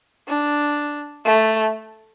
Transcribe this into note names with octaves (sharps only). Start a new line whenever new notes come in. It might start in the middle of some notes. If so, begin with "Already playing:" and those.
D4
A3